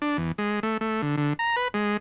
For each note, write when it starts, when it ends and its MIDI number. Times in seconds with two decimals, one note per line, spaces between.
0.02 0.17 62
0.18 0.32 40
0.38 0.60 56
0.63 0.77 57
0.81 1.02 57
1.02 1.16 50
1.18 1.33 50
1.39 1.56 82
1.56 1.68 71
1.74 1.97 56